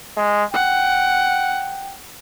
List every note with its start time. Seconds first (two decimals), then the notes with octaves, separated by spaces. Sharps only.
0.17 G#3
0.53 F#5 G5